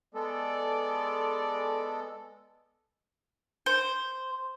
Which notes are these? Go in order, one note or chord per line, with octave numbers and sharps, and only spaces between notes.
G#3 B3 A4 D5
C5